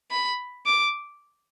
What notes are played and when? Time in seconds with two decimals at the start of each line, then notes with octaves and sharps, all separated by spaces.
0.11 B5
0.66 D6